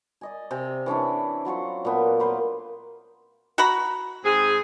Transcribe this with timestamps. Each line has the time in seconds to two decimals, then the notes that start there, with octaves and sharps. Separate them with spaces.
0.21 D5 D#5 G#5
0.51 C3 G5 G#5
0.86 E3 C#4 D4 E4
1.45 F#3 F4 C5 C#6
1.85 A#2 A3 B3
2.20 A#3 F4 B4 C5
3.58 F#4 A#5 B5
4.25 G#2 C4 G#4